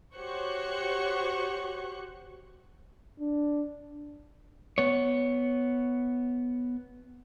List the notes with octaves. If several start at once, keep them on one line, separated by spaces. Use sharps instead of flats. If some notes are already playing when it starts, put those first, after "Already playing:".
F#4 G4 C5 C#5 C#6 F#6
D4
B3 C#5